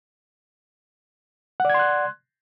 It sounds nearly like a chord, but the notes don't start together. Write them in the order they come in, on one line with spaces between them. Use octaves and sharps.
F#5 D5 G#6 C6 F#6